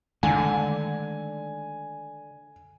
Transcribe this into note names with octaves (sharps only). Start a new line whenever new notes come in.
D3 D#3 G#3 A3 G#5